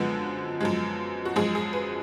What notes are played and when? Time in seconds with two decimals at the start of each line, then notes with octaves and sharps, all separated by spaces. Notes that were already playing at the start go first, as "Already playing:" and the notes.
Already playing: F#2 D3 F3 G#3 B3
0.61 F#2 F3 G#3
1.25 F#4
1.36 F#2 F3 G#3 G#4
1.55 G#4
1.73 B4